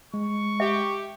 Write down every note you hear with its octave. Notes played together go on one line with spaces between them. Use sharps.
G#3 C#6
G4 E5